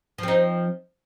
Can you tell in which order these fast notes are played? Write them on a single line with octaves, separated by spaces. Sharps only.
F3 C4 D#4